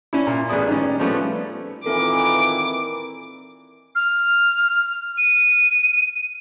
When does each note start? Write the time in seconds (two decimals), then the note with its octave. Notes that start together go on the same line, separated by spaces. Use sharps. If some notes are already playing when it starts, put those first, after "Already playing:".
0.13 C#4 D4 E4
0.27 A#2
0.49 A1 B3 G#4 D5 D#6
0.68 D#3 G3 C#4
0.99 F3 G3 A3 B3 C#4
1.86 A#2 D#3 E3 C4 A4 A#4 D6
3.95 F6
5.18 D#7